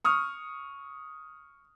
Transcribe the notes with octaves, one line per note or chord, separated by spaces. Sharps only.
C#6 D#6 F6